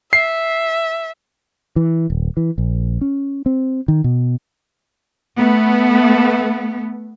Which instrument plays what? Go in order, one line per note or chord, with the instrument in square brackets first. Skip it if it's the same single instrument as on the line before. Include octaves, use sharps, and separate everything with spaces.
[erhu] E5 [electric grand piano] C7
[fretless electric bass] E3
D#1
E3
A#1
C#4
C4
D#3
B2
[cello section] A3 B3